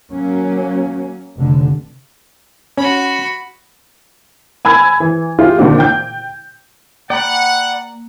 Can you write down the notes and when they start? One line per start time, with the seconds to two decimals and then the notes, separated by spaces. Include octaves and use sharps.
0.12 F#3 A#3 C#4
1.39 F1 D3
2.77 C#4 F#4 B5
4.65 G#5 B5 E6 G#6
5.00 E3
5.39 E4 F4 G4 G#4
5.57 A#2 D3 C4 D4 D#4 F#4
5.78 G5 G6
7.10 A#3 D5 F#5 G5 B5